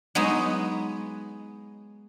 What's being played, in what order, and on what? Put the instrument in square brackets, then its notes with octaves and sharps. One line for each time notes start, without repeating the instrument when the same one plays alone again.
[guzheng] F#3 G#3 B3 D#4 F#4